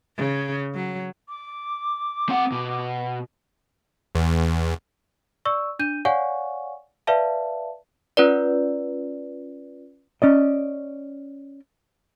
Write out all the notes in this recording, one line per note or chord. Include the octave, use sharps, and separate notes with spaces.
C#3
F#3
D6
C4 F#5
B2
E2
D5 C#6 E6
D4 G6 D#7
C#5 D5 F5 F#5 G#5 C#6
B4 D5 E5 F5 A5
C#4 F4 B4 D5
C#4 D5 D#5